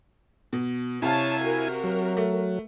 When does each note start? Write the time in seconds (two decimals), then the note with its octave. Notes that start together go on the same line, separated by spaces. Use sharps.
0.53 B2
1.02 C3 E4 C#5 F5 G#5 A5
1.40 F#4 A#4
1.84 F#3
2.17 A3